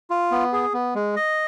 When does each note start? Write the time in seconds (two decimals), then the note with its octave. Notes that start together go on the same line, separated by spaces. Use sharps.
0.10 F4
0.32 B3
0.53 G#4
0.74 B3
0.95 G#3
1.16 D#5